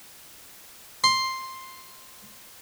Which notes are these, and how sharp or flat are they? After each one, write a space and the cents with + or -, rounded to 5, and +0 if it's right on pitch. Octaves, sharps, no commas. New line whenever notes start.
C6 +5